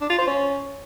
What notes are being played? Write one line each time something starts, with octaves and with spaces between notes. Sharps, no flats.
D4
F4
C5
C#4